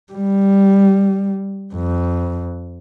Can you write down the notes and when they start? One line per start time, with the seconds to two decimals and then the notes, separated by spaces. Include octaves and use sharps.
0.12 G3
1.74 F2